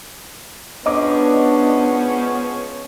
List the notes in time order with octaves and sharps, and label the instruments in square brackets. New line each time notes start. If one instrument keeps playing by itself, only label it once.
[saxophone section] F3 G#3 C#4 [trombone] B3 [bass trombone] D4 [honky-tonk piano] D#5 D6